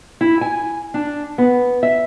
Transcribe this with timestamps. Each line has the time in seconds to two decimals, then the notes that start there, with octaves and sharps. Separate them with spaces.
0.21 E4
0.41 G#5
0.94 D4
1.38 B3
1.83 E5